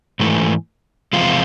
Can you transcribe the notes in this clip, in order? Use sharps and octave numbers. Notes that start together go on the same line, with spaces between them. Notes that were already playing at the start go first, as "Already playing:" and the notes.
G#2 E3 A3
E2 C3 F3 G#3 F4